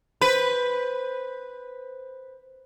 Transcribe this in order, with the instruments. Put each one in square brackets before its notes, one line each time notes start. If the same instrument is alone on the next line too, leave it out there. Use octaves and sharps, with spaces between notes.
[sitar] B4 [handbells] C5